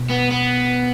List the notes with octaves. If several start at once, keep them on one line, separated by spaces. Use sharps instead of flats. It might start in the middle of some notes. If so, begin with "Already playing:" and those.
Already playing: B2
B3
B3